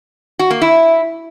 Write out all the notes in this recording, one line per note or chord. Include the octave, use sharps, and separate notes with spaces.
F#4
A#3
E4